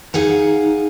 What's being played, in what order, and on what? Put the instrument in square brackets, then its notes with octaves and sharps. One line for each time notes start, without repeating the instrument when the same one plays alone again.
[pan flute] D#4 [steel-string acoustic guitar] G#4 F5 F#5